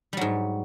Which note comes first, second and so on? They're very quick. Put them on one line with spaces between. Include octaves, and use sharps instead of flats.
G3 F#3 G#2